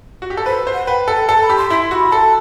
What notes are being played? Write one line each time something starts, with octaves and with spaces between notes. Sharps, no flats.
F#4
G4
A4
B4 C5
C5
F#5
B4 G5
A4
A4 A5
B5
G4
C6
E4 C6
F#4 B5
A4 A5